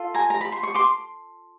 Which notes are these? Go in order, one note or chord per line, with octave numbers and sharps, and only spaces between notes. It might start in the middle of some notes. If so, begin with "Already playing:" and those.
Already playing: F4 A4
G#5 A#5
A#5
B5
C6
C#6
C6 D6